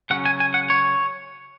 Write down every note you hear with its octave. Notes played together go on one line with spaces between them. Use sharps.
C#3 F#3 C#4 F#5
G#5
G#5
F#5
C#5